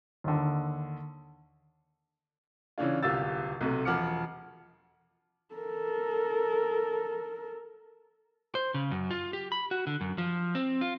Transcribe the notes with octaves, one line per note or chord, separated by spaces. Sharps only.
D#2 D3
C#3 E3 C#4 D4 F4
D1 C2 F4 G4 E6 A6
B1 C3 A3
E1 F3 F#5 D6 F6 C#7
A4 A#4
C5
C#3
F#2
F4
G4
B5
F#4
D3
F#2
F3
C4
F4